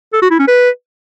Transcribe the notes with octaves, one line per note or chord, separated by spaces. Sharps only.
A4
F#4
E4
C#4
B4